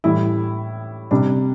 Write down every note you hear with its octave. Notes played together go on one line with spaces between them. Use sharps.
A2 E3 G3 E4
C3 G3 D4